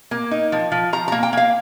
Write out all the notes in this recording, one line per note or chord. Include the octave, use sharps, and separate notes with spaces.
A#3
D#4
F3
F3
F3 A#5
A#3 A#5
G5
A#3 F5